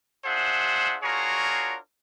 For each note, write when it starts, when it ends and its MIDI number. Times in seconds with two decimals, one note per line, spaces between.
0.25 0.97 62
0.25 0.97 65
0.25 0.97 68
0.25 0.97 72
0.25 0.97 76
0.25 0.97 78
1.03 1.77 62
1.03 1.77 65
1.03 1.77 66
1.03 1.77 68
1.03 1.77 70
1.03 1.77 73